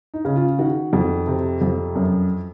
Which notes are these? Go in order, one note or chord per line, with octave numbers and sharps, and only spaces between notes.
D#4
C#3
F4
D#3 F#4
F2
C3
F2
F#2